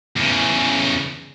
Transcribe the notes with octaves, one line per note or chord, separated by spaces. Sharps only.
E2 C#3